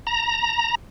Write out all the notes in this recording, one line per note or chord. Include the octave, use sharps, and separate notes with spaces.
A#5